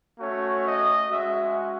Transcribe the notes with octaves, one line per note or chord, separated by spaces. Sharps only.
A3 C#4 F#4 C#5
D#5
G#3 C#4 F#4 E5